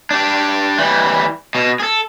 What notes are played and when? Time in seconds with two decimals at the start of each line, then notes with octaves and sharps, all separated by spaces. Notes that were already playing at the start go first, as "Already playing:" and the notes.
0.11 D4 G4
0.79 E3 G3
1.55 B2
1.80 G#4 A4